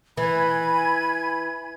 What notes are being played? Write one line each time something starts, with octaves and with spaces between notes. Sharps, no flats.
E3 G#5 B5 G#6